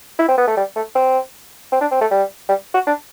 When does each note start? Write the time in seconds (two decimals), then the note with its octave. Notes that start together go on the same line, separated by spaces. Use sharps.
0.19 E4
0.28 C4
0.38 B3
0.48 A3
0.57 G3
0.76 A3
0.95 C4
1.72 C4
1.81 D4
1.92 C4
2.01 A3
2.11 G3
2.49 G3
2.74 F#4
2.87 D4